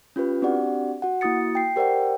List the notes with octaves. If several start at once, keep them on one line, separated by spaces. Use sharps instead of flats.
C#4 F4 G4 B4
C4 D4 F#4 G4 D5 F#5
F#4 F#5
A#3 E4 F#4 D#6 A6 C#7
G5 C7
G4 A#4 C5 D5 F#5 G5